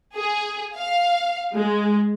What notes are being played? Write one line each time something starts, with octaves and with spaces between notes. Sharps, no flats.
G#4
F5
G#3